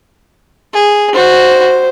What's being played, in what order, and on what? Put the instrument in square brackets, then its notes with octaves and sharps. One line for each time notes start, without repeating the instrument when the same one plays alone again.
[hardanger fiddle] G#4
[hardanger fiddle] F#4 [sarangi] C5